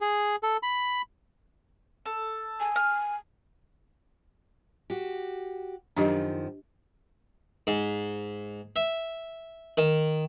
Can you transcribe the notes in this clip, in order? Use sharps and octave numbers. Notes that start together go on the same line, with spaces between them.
G#4
A4
B5
A4
G#5
F6
F#4 G4
F#2 D#3 F3 D4 G4 D#5
G#2
E5
D#3